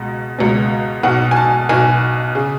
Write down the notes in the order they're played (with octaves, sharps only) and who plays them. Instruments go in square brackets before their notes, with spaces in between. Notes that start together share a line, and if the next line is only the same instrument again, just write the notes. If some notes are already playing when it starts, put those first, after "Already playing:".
Already playing: [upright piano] C#2 B2
C#2 B2
B1 B2 F#5
G#5
A5
B1 B2 G#5
C#3